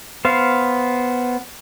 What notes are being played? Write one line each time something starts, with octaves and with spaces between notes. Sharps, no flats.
B3 C5 F5